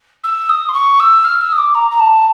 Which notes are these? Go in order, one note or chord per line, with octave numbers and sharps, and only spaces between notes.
E6
D#6
C6
C#6
E6
F6
E6
D#6
D6
A#5
A#5
A5